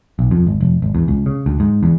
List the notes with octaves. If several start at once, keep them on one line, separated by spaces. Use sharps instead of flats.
B1
F2
G#1
F1
G#1
E2
C#2
C#3
D2
G#2
E2